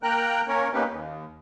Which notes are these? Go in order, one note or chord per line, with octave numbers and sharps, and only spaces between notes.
A#3 A#4 G5 A#5 F#6
A#3 C#4 A#4 C#5
A#3 B3 C#4 D#4 G4 B4
D#2